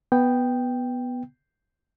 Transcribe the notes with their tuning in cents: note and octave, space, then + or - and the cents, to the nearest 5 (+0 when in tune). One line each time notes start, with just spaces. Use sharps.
B3 +0 G5 +0